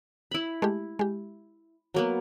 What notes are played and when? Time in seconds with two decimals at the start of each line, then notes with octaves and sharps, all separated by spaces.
0.31 E4 B5
0.62 G#3 A3 G4
0.99 G#3 G4
1.94 F#3 A#3 B3